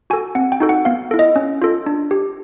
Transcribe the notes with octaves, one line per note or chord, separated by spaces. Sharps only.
F#4 A4 G#5
C4 F#5
G5
D#4 F#4 A4
F#5
B3 F5
E4 A4
D#5
C#4
F4 A4
D4
G4